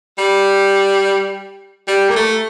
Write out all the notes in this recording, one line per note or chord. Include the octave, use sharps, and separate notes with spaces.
G3
G3
A#3
A3